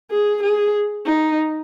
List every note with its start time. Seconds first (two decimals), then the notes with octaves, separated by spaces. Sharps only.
0.11 G#4
0.43 G#4
1.06 D#4